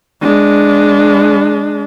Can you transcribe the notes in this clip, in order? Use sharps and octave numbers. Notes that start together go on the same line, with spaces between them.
G#3 D4